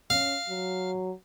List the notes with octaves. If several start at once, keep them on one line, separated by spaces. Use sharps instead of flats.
C#4 F5
F#3